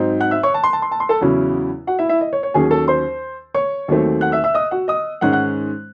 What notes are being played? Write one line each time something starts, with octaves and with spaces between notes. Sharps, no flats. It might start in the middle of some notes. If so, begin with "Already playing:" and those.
Already playing: G#2 F#3 C4 D#4
F#5 F#6
E5 E6
C#5 C#6
A5
C6
A5
C6
A5
C6
A4 A5
E2 C#3 F#3 C#4 E4
F#4 F#5
E4 E5
E4 E5
D#5
C#5
C#5
D#2 D#3 F#3 C#4 G#4 G#5
A4 A5
C5 C6
C#5 C#6
D#2 D#3 F#3 A3 C4
F#5 F#6
E5 E6
E5 E6
D#5 D#6
F#4 F#5
D#5 D#6
G#2 D#3 G#3 C#4 F#5 F#6
F#5 F#6